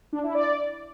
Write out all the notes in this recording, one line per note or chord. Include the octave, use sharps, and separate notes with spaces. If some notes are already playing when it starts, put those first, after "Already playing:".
D4
E4
D5